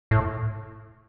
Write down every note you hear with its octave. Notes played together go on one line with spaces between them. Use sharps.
A2